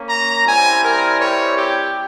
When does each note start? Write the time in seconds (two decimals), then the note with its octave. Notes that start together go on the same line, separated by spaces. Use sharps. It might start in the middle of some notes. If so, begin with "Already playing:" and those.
Already playing: A#3 C#4
0.09 A#5
0.46 G3 C4 E4 G#5
0.82 A#4
1.19 C#5
1.56 G4